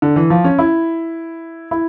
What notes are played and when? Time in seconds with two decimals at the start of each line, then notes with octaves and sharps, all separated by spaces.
0.02 D3
0.16 E3
0.30 F3
0.44 C#4
0.59 E4
1.71 E4